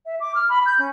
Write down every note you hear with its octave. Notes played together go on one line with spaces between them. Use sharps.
E5
D6
F6
B5
G6
C#4